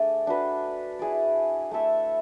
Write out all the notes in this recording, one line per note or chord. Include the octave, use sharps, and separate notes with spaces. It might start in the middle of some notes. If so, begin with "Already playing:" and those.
Already playing: A3 D4 G#4 D5
D4 F#4 B4
E4 G#4 D5
A3 E4 A4 E5